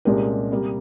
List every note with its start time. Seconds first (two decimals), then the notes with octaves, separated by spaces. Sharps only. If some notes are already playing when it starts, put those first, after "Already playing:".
0.05 C2 A#2 G#3 C#4 G4 A#4
0.52 C3 G3 A#3